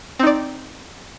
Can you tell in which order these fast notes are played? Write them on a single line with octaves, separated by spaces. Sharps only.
C4 D#4 D5